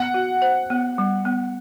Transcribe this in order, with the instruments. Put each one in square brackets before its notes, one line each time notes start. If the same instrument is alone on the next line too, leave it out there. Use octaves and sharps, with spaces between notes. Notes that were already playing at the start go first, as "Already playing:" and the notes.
Already playing: [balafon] B3 [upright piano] F#5
[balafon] F#4
C5
B3
G3
B3